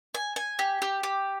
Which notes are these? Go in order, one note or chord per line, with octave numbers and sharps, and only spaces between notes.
G#5
G#5
G4
G4
G4